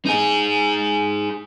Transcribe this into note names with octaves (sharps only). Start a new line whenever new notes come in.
D#4 G#4